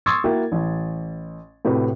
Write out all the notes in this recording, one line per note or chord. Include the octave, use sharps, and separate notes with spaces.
C6 C#6 D#6 E6 G#6 A6
A#3 E4 F#4 G5
A1
A2 C3 F#4 B4